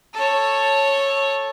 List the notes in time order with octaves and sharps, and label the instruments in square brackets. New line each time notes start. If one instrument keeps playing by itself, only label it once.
[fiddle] A4 C#5